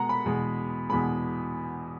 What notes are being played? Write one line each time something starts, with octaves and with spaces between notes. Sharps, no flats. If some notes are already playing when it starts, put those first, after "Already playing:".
Already playing: B2 G#3 F#5 A#5
B5
E2 B2 G#3
E2 B2 G#3 B5